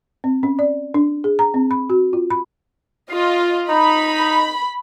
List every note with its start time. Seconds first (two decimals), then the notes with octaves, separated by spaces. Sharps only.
0.24 C4
0.43 C#4
0.59 D5
0.94 D4
1.24 G#4
1.39 A#5
1.54 C4
1.71 B5
1.90 F#4
2.13 F4
2.31 B5
3.11 F4 D#5
3.69 D#4 B5